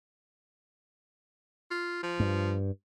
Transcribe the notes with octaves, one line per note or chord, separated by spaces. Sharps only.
F4
F3
G2